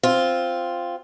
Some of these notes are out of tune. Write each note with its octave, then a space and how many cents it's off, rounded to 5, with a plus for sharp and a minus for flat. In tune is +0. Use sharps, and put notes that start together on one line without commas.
C4 +0 F4 +0